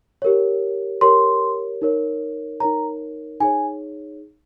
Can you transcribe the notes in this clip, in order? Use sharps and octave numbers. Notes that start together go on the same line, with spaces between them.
G4 A#4 C#5
G4 A#4 C#5 C6
D#4 A#4 C#5
D#4 A#4 C#5 A#5
D#4 G#4 C#5 G#5